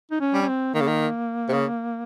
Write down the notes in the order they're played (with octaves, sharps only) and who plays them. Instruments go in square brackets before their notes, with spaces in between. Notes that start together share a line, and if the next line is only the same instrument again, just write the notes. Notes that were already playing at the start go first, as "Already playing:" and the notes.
[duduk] D#4
C#4
[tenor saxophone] G3
[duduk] C#4
C4
[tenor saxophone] D#3 [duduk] A#3
[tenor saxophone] C#3
D#3
C3
C#3